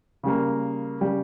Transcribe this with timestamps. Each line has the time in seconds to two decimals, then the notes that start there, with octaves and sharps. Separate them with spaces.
0.23 C#3 G3 A#3
1.01 C#3 G3